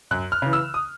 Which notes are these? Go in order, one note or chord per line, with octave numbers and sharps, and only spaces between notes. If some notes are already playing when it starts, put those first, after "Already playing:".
F#2 F#6
F6
C#3 E3
E6
D#6